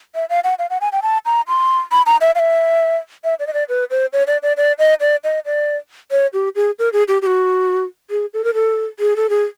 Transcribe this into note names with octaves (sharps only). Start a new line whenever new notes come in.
E5
F5
F#5
F5
F#5
G#5
G5
A5
A#5
C6
B5
A#5
E5
F5
E5
E5
D5
D#5
D5
B4
C5
C#5
D5
D5
D5
D#5
D5
D#5
D5
C#5
G4
G#4
A#4
G#4
G4
G4
F#4
G#4
A4
A#4
A4
G#4
A4
G#4